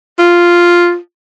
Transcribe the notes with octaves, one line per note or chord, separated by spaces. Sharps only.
F4